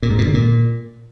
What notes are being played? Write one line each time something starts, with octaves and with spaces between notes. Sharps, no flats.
A#2
G#2
B2
D3
A#2